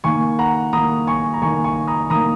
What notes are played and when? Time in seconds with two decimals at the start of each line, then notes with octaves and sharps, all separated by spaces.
0.04 D#3 A#3 G#5 C#6
0.39 F#5 A#5
0.73 D#3 A#3 A#5 D#6
1.07 G#5 C#6
1.34 A#5
1.42 D#3 A#3 G#5 C#6
1.64 G#5 C#6
1.88 A#5 D#6
2.10 D#3 A#3 A#5 D#6